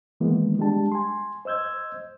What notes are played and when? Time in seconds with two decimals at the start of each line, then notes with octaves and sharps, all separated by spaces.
0.20 D#3 E3 G#3 A#3 B3
0.58 G3 G#3 D4 G4 A5
0.92 G#5 C6
1.45 C5 D#5 E6 G6 G#6